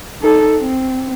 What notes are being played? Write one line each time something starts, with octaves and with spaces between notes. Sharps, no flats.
D#4 A4
C4